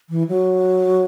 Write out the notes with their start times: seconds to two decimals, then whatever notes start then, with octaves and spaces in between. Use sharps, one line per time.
0.10 E3
0.29 F#3